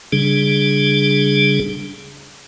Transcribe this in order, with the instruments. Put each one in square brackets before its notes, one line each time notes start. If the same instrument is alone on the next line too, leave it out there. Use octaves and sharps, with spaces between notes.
[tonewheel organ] C#3 G3 D4 G#4